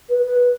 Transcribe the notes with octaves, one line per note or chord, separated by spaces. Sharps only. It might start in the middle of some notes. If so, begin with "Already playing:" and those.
B4
B4